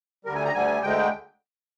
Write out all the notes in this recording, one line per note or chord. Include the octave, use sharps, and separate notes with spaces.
D2 D3 G3 A#4
G#5
A#5
D2 D3 G3 G#5
D2 D3 G#3 G5